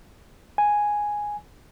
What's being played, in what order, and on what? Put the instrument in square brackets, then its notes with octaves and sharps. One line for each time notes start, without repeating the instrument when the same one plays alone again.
[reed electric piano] G#5